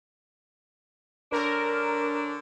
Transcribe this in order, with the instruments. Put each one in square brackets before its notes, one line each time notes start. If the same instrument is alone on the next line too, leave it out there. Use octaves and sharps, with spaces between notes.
[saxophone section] D3 C#4 D4 [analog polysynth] A#4